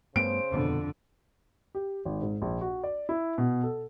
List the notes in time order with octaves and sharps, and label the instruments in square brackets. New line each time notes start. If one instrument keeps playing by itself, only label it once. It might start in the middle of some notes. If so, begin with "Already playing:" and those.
[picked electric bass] G2 A3 B3 [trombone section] C#3 C5 [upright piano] D7
[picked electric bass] D#1 B2 B3 [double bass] F2 D3
[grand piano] G4
G#1
G#2
A#1
F#4
D5
E4
B2
A4